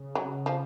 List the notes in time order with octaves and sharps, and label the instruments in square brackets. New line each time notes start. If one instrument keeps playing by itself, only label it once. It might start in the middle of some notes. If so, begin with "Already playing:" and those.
Already playing: [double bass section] C#3
[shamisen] F#3
F3